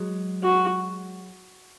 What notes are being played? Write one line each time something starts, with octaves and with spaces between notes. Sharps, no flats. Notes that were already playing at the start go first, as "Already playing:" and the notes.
Already playing: F#3 G#3
F#4